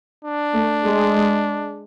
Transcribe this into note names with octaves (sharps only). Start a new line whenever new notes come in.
D4
A3
G#3